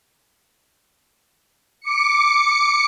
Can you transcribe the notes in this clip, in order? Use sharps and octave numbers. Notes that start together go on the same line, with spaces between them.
D6 C#7